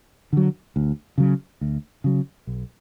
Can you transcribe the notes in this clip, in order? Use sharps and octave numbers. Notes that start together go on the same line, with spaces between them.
D3 F#3
D2
C#3 F#3
D2
C#3 F#3
B1